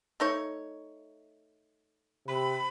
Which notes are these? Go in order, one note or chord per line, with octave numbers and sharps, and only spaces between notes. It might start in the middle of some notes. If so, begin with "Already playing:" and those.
A3 D#4 C#5
C3 B5